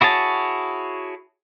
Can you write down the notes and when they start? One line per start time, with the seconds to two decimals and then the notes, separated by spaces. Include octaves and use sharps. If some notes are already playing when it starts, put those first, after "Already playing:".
0.01 E4 F#4 G#4 C#5 A5